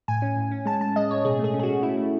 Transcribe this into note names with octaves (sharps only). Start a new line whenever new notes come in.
A2 G#5
C#4
A2
C#4
G#3 A5
A2 A5
G#3 D#5
A2 C#5
B2 G#4
A3 G#4
C#4
G#4
F#4
C#4
A3 E4
A3